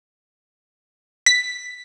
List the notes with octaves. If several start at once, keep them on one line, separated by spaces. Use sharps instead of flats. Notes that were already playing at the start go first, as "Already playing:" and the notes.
B6